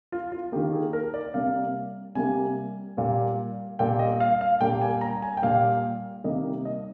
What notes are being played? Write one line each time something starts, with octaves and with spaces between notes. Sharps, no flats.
F4
F4
D#3 A#3 G4
G#4
A#4
D5
C3 G3 A#3 F5
C3 G3 A#3 G#5
A#2 G3 A#3
A#2 G3 A#3 G5
D#5
F5
F5
A#2 G3 A#3 G5
G#5
A#5
G#5
G5
A#2 G3 A#3 F5
C3 D#3 G3 A#3 D#5
D#5